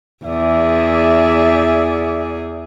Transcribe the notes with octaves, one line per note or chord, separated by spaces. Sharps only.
E2 G#4 D5 E5